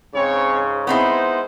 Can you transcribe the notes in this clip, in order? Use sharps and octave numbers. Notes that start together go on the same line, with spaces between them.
G#2 C#3 C4 C#5
G#3 B3 C4 D#4 E4 C5